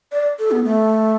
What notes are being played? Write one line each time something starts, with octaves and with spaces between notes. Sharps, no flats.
D5
A4
B3
A3